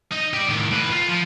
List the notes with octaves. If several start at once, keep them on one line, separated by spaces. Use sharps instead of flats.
D#4 D#5
G4 D5
A2 D#3
A2 B4
F4
F3